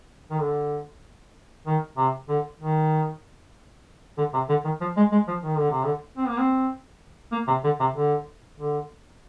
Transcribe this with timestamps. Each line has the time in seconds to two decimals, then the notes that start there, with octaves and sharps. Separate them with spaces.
0.31 D#3
0.41 D3
1.67 D#3
1.97 C3
2.29 D3
2.60 D#3
4.18 D3
4.34 C3
4.49 D3
4.65 D#3
4.81 F3
4.97 G#3
5.12 G#3
5.28 F3
5.44 D#3
5.58 D3
5.71 C3
5.84 D3
6.17 C4
6.28 A#3
6.38 C4
7.32 A#3
7.48 C3
7.64 D3
7.80 C3
7.95 D3
8.58 D3